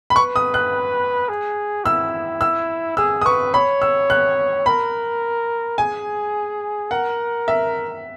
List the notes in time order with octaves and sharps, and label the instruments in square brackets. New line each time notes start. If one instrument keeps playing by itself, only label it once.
[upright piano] B5
[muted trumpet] B4 [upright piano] C#6
[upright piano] D#6
F#6
[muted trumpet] G#4
[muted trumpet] E4 [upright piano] E6
[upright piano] E6
[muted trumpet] G#4 [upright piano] E6
[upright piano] D#6
[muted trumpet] B4 [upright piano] C#6
[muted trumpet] C#5 [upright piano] B5
[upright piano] E6
F#6
[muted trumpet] A#4 [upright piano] B5
[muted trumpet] G#4 [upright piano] G#5
[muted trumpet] A#4 [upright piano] F#5
[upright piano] E5